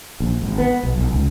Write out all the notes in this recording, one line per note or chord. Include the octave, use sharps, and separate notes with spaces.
A#1
G#1
B3
B1
B1
C#2